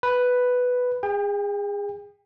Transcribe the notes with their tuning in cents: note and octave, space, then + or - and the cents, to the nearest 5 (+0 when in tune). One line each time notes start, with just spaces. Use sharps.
B4 +5 B5 +0
G#4 -25 G5 +30